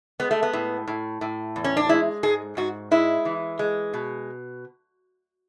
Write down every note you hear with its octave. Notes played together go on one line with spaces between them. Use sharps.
G#3 B3
A3
B3
A2
A2
A2
E2
C#4
D4
G#3 E4
G#2 G#4
G#2 F#4
G#3 E4
E3
G#3
B2